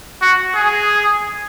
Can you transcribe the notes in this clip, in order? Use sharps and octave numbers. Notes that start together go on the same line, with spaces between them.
F#4
G#4